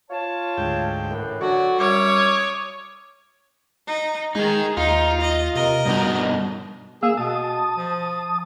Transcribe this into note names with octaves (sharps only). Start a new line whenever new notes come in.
F4 C#5 A5
D2 G#2 G5
F#2 A2 E3
D3 F#3 F#4 C#5 D5
F#2 G3 C#5 E5 C#6 D6 F6
C#6 D#6
D#4
D#3 G#3 D#4 G#4
D#2 D#4 F4
D#5
C3 A#4 D#5
G2 B2 G3 D#4
A#3 G#4 F5 E6
B2 A5 D#6
F3